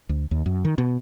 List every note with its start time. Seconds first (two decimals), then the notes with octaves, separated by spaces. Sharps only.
0.09 D2
0.31 D#2
0.46 F#2
0.65 D#3
0.78 B2